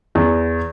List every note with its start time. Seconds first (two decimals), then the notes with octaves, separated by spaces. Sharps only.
0.15 E2